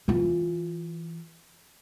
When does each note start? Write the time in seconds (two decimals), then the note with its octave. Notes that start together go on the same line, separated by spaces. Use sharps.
0.08 E3 F4